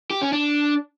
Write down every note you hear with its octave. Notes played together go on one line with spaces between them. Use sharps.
G4
C#4
D4